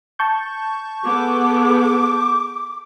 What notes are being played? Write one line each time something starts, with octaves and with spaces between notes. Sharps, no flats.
A5 C#6 G6
B3 G#4 A4 D6